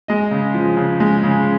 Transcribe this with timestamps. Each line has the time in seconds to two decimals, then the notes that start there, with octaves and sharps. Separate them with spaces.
0.08 G#3 D#5
0.31 C#3
0.54 F3
0.77 C#3
1.00 G#3
1.23 C#3